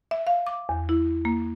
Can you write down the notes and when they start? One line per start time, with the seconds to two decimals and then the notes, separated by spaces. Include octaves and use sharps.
0.11 E5
0.27 F5
0.47 D6
0.69 E2
0.89 E4
1.25 A#3